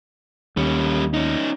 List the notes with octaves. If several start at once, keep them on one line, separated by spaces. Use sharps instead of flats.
D#2 G3 C#4
C#4 D#4